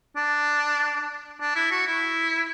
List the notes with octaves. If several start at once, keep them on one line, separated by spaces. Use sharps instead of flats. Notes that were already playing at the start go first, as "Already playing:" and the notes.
D4
D4
E4
F#4
E4